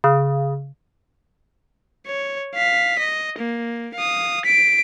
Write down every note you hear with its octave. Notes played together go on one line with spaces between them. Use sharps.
C#3
C#5
F5 B6
D#5
A#3
F5 D#6
B6 D7